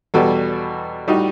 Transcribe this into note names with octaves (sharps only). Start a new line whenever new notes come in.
E2 B2 G3 F#4 A4
A2 G3 D#4 F#4